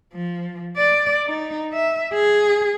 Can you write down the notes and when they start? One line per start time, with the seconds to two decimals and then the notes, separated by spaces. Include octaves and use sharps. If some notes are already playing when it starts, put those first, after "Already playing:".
0.13 F3
0.76 D5
1.26 D#4
1.73 E5
2.14 G#4